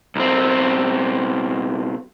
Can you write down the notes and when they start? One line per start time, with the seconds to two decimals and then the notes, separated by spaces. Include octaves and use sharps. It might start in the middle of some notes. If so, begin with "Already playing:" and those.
0.16 B1 C4